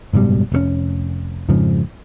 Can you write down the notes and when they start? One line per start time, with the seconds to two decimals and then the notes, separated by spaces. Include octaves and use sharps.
0.13 F#1 G#2 B2 G3
0.52 F1 C3 C#4
1.49 F2 G#2 C#3 F3